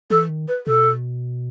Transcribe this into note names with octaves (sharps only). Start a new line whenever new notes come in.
E3 A4
D#3
B4
B2 A4